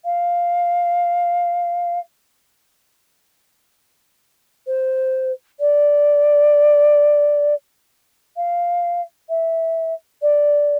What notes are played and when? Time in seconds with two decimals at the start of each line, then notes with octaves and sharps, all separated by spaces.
0.05 F5
4.67 C5
5.60 D5
8.37 F5
9.29 E5
10.22 D5